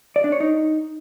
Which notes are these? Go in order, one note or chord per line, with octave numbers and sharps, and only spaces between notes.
D5
D4
C#5
D#4